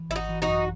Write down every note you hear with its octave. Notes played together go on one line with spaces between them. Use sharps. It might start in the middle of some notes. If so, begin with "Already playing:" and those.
Already playing: E3
G#1 E4
D#4 F#4
E3
D#4 F#4
F#2